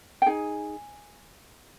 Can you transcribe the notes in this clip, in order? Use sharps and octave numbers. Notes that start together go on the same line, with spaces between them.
G5
D#4 G#4 G#5